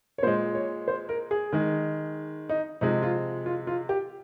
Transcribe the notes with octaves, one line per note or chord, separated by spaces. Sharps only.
C#5
A#2 G#3 C5
C#5
C5
A#4
G#4
D#3 G#3
D#4
C3 F3 G#3 D#4
F4
F4
F4
G4